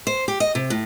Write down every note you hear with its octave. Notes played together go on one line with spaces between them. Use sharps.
C5
G4
D#5
C3
A2